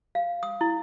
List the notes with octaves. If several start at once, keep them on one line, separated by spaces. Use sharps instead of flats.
F5
D#6
E4